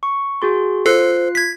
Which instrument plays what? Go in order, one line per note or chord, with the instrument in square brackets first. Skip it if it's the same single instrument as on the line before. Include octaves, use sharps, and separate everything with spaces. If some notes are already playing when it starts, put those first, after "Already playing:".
[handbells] C#6
F#4 G#4 C6
[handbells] F4 F#6 C7 [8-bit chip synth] A4 [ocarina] C5
[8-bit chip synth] G#6 B6